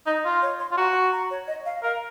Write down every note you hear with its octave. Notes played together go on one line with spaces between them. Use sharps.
D#4 D#5
F4
C#5
C6
F4
F#4 A#5
A#5
C#5
D#5
F5
A#4 F5